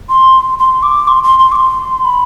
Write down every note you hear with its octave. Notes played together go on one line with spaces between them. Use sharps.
C6
C6
D6
C6
C6
C6
D6
C6
B5